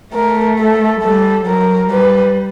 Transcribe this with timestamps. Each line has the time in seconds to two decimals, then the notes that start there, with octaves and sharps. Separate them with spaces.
0.14 A3 A#4
0.58 A4
1.02 G3 A4
1.47 F#3 A#4
1.91 G3 B4